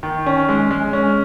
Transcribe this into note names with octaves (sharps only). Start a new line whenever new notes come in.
D#3
C#4
G#3
G#3
C#4